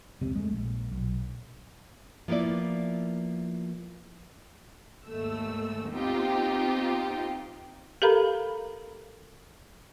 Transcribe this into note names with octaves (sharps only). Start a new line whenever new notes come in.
F1 C#2 C3
G#3 A3
A#1
B1
F3 A#3 B3 E4 D5
D#2 G#2 A3 E6
B3 C4 D#4 F4 G4
G4 A4 A#4 F5 A#5 B5